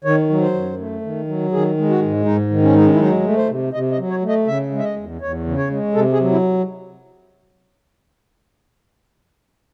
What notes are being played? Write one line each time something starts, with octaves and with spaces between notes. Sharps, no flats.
D#3 C#5
F#3
C5
F#2
A3
D#3
F#3
D#3 G#4
G#3
F#4
G#2
G#2 D#4
D#3
C#4
G#3 D#4
C#4
E4
F#3 D#4
A3
C5
C3
C3 D#5
D#5
F#3
C#5
A3
D#5
C#3 E5
G#3
E5
D#5
E2
E2 C#5
C#3
C#5
G#3
C3 A4
G#4
F#3
E4